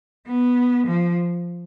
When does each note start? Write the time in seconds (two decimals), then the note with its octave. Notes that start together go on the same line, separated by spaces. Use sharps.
0.27 B3
0.87 F3